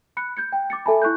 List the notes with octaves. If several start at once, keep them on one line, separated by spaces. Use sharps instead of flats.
B5 F#6 C#7
G6 G#6 C#7
G5
D6 A6 C#7
A4 E5 G#5 A5 B5
E4 C#6 F#6 G6